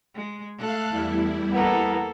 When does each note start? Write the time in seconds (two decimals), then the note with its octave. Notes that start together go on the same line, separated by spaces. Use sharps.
0.15 G#3
0.58 A3 A4 F5 F#6
0.89 E2 G3 E4
1.52 A#3 B3 A4 A#4